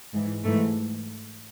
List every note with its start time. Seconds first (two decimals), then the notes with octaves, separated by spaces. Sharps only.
0.13 G#2 E3
0.44 G#2 E3 A3